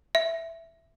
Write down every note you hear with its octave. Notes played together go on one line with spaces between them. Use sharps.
E5